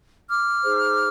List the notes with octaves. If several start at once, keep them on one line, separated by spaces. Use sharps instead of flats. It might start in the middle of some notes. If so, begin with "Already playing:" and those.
D6 F6
D#4 G#4 C5